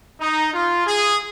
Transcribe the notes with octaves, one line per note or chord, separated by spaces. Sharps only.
D#4
F4
G#4